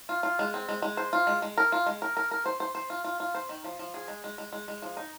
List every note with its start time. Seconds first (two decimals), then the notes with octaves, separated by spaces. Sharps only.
0.09 F4
0.23 F4
0.39 G#3
0.54 C4
0.69 G#3
0.82 G#3
0.97 C5
1.13 F4
1.27 G#3
1.42 G#3
1.58 A#4
1.72 F4
1.86 G#3
2.02 A#4
2.17 A#4
2.31 A#4
2.46 C5
2.60 C5
2.75 C5
2.90 F4
3.04 F4
3.20 F4
3.35 C5
3.49 D#3
3.64 F3
3.79 F3
3.94 G#4
4.08 G#3
4.24 G#3
4.38 G#3
4.53 G#3
4.68 G#3
4.82 F3
4.97 D#4